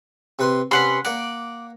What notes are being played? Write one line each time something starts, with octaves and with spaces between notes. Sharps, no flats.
C3 B4 C6
C3 C#4 B4 F#5 C6
A#3 D5 F#5